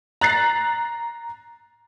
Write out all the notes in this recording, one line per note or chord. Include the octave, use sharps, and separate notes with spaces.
A#5 F#6 A6 C7